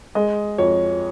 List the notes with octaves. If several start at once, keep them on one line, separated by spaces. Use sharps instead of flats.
G#3 D#5
F2 C#5